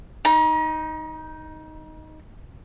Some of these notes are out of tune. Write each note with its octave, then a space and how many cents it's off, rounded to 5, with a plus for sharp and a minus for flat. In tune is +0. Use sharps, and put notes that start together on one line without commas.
D#4 +0 A#5 +40